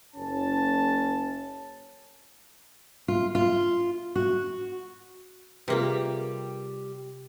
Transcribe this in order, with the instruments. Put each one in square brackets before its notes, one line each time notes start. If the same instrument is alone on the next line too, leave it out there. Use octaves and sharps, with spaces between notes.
[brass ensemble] F#1 C#4 A5
[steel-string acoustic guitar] F4
F4
F#4
[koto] C3 A#3 [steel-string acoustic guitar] G3 G4 [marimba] F4 G#4 B4